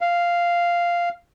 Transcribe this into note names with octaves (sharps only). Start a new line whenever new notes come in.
F5